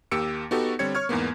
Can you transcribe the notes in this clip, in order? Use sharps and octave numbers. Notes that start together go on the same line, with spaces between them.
D#2 A#3 G4 E6 C#7 D7
B3 D#4 F#4 G4 A4
D3 G3 C4 C#5 G#6 C#7
C#5 C#6 F6 G#6
E2 G#2 A#3 B3